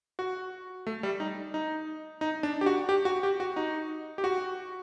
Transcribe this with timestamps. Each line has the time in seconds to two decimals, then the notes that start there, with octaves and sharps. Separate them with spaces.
0.19 F#4
0.87 A3
1.03 G3
1.20 D#4
1.54 D#4
2.21 D#4
2.43 D4
2.61 G4
2.66 F#4
2.89 G4
3.05 F#4
3.23 G4
3.40 F#4
3.56 D#4
4.18 G4
4.24 F#4